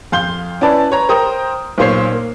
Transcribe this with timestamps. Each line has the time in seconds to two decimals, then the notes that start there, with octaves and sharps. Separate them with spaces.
0.12 F2 F5 C6 G6 G7
0.61 C#4 E4 B4 D5 A5
0.91 B4 C#5 A#5
1.09 A#4 C5 G5 A#5 D#6
1.78 B1 A#2 C5 C#5 C7
2.12 A#3